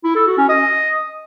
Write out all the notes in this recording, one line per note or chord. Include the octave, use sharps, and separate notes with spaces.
E4
A4
F#4
C#4
D#5